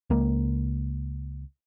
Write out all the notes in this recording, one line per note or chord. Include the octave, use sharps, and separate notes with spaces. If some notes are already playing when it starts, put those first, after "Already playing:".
C#2 G#3 A#3